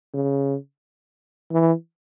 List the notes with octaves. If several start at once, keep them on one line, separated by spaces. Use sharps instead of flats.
C#3
E3